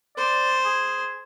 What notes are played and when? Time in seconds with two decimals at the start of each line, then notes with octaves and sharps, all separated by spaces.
0.17 C5 D5
0.65 G#4